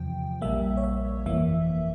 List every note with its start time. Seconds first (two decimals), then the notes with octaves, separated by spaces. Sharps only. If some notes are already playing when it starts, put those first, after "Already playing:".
Already playing: E2 C3 F3 G5
0.41 A#1 A#2 G3 A#3 E5
0.77 C#5
0.84 E5
1.26 G1 F2 E3 A#3 E5